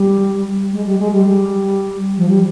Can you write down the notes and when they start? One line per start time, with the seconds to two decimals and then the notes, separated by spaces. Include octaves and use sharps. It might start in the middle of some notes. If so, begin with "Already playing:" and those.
Already playing: G3
0.72 G#3
0.86 G3
0.98 G#3
1.12 G3
1.25 G3
2.17 F3
2.28 G3